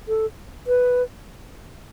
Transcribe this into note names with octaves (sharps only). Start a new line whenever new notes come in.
A4
B4